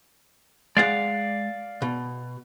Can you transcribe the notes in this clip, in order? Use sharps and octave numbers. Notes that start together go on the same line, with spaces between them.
G#3 D5 F5 F#5
B2